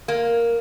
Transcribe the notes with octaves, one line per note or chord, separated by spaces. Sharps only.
A#3